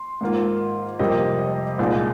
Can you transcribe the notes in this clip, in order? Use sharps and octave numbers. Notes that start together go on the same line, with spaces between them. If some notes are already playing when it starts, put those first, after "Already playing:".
Already playing: C6
G#2 D#3 A#3 F4
F2 C3 G3 A#3 D#5
D#5
C2 A#2 G#3 D#4 D5